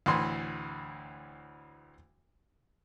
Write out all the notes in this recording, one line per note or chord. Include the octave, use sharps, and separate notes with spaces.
D2 A2 E3 C6